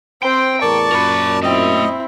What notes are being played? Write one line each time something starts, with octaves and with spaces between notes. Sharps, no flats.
C4 C5 G5
E2 A2 A#4 D5 A5 C#6
F#2 A#2 A#4 B5
A3 C4 E4 D#5 G5